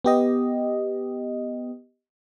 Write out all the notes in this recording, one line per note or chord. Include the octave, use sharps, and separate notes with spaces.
B3 G4 D#5